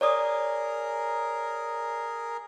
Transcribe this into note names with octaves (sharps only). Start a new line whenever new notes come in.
G#4 A#4 C#5 D5 D#6